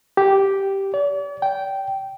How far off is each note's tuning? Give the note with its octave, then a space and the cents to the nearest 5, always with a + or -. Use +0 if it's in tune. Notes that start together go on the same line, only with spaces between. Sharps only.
G4 -5
D5 -45
G5 -10